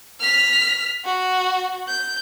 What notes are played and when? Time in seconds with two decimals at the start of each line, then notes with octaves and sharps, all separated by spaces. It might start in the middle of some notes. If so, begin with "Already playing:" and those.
0.20 F6 B6
1.05 F#4
1.88 G6